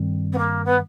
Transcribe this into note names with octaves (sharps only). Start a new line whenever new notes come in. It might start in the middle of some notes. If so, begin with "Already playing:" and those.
Already playing: G2 D#3 G3 C4
B3
A#3
B3